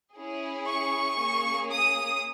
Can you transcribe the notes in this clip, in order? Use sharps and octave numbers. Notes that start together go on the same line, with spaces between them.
C#4 E4 G#4
C#6
A#3 C#4 G#4
D#6